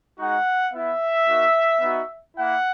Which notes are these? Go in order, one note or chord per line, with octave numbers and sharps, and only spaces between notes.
G#3 D#4 F#4 F#5
B3 E4 E5
A#3 D#4 F#4
B3 D#4 F#4
A#3 E4 F#5